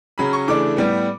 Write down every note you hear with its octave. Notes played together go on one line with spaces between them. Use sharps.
C#3 F#3 C#4 B5
C#6
C#3 E3 A3 D4 D6
A2 G3 B3